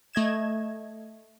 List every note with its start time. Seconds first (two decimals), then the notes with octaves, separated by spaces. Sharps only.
0.13 A3 D#5 G#6 E7